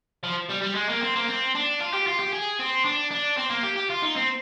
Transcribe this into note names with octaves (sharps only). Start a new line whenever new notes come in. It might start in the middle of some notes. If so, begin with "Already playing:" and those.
F3
G3
G3
G#3
A#3
C4
A#3
C4
D4
F4
G4
F4
G4
G#4
C4
D4
D4
C4
A#3
G4
G4
F4
D#4
C4